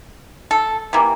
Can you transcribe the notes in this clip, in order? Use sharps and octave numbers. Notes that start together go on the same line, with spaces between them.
A4
C3 E3 A#3